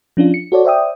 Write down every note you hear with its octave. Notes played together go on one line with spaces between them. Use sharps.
F3 C#4 D4 F4
C#7
F#4 A4 C#5 D5
C5 D5 E5 G5 D#6